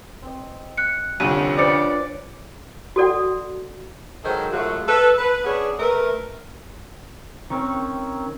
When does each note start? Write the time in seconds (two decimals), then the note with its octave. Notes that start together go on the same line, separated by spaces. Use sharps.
0.22 C4 D#5
0.77 F#6 C#7
1.20 C2 F2 D3 C#4 F4 D#7
1.58 C#4 D4 B4 C5 D5 C#7
2.96 F#4 A4 D5 F#5
4.24 D#3 F#3 G#3 G#4 A4 C5
4.52 F#2 G#3 A3 F4 F#4
4.88 A4 B4
5.19 B4
5.45 B3 C#4 D4 G#4
5.79 A3 A#4 B4
7.50 D#3 C4 C#4